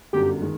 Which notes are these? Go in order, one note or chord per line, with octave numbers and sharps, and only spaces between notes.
G1 F#2 D3 G4
D#3 G#3